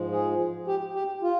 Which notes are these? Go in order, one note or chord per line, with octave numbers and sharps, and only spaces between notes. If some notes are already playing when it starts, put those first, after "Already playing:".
Already playing: G#2 F3 G#3
G#4
G4
G4
F4